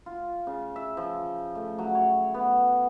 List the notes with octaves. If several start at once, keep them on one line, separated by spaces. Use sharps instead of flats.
F4
C#3
E5
F3
A3
F#3
C#5
B3